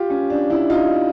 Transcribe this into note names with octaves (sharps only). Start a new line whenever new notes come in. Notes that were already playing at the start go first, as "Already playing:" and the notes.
Already playing: F4 G4
C#4
D4
D4 E4
D#4 F4